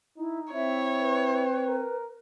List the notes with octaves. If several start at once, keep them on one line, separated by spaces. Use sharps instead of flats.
D#4 E4
C4 E4 C#5 E5
B4
A#4